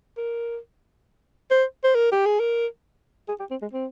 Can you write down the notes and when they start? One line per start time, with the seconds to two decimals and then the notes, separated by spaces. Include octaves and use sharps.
0.18 A#4
1.51 C5
1.84 C5
1.95 A#4
2.12 G4
2.26 G#4
2.40 A#4
3.29 G#4
3.40 G4
3.51 C4
3.62 G#3
3.73 C4